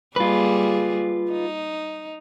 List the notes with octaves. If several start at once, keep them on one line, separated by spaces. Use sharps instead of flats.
G3 A#3 F4 G#4 B4
D#4